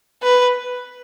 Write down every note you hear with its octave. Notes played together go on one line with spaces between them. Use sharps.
B4